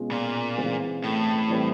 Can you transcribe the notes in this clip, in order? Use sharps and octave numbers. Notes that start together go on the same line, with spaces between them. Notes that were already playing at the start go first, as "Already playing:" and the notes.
Already playing: B2 G#3 C#4 F4
A#2
C#3 E3 G#3 C4
A2
E3 G3 C4